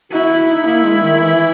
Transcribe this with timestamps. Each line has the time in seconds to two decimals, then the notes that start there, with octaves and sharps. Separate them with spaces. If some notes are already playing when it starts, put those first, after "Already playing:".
0.11 E4 F#4
0.47 D#4
0.65 A#3 E4
0.83 G#3
1.01 D#3
1.20 E3